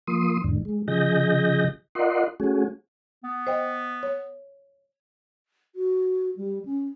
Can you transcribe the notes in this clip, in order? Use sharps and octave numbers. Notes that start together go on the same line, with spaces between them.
F3 A#3 C6 D#6
E2 G#2 D3
G#3
C#3 F3 G#4 D#5 G6 A#6
F4 A#4 D5 D#5 F#5 C6
A3 C#4 F#4 G#4
B3
C5 D#5 G5
C#5
F#4
G3
C#4